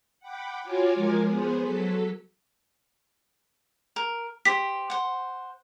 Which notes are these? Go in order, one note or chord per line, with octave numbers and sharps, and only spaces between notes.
F#5 G5 B5 D6
F4 F#4 C#5 G#5 D6
F3 G#3 A#4 G#5 D6
B3 G#4 C5
F#3 A4 B6
A#4
G4 C5 B6
C5 F#5